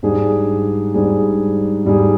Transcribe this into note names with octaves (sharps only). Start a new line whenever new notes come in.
G#2 G3 D4 G#4
G#2 G3 D4 G#4
G#2 G3 D4 G#4